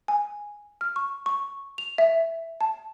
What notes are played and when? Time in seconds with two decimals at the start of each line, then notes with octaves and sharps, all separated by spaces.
0.08 G#5
0.81 F6
0.96 C#6
1.26 C#6
1.78 F7
1.98 E5
2.61 A5